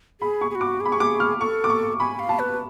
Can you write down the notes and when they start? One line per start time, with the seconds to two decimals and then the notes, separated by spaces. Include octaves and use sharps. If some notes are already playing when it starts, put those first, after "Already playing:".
0.21 G#4 B5
0.41 C#6
0.50 G#4
0.55 F#4
0.61 D6
0.80 G#4 B5
0.92 C#6
1.00 D6
1.20 F6
1.40 A4 C#6
1.64 D6
1.70 C#6
2.00 G#5 B5
2.19 F5
2.29 A5
2.39 B4